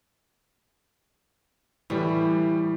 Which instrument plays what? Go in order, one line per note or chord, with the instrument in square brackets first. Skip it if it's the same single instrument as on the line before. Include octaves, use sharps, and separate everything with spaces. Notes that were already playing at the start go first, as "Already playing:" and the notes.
[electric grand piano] A2 G3 [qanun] E3